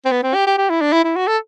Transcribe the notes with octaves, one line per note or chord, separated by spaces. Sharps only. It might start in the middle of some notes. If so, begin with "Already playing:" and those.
C4
B3
C4
G4
G4
G4
E4
D4
E4
E4
F#4
A4